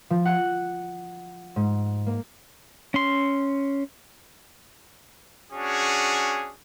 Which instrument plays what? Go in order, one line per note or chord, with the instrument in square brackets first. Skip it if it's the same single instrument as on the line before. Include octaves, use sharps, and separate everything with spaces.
[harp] F3
F#5
G#2
A#3
[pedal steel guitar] C#4 C6
[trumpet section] C#4 D4 F#4 G#4